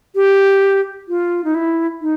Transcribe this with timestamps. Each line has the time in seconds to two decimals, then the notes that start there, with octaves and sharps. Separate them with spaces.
0.15 G4
1.08 F4
1.45 D#4
1.55 E4
2.01 D#4